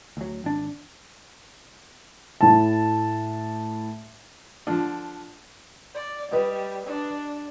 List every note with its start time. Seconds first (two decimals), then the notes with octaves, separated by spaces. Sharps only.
0.17 D2 F#3
0.44 G#1 D4
2.41 A2 A5
4.67 D3 F3 D4
5.95 D5
6.33 G3 B4 D#5
6.87 D4